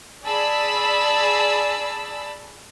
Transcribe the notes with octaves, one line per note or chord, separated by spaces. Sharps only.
G#4 D5 A5 B5 E6